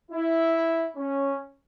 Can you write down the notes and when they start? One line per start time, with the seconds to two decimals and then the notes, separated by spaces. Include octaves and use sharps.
0.11 E4
0.96 C#4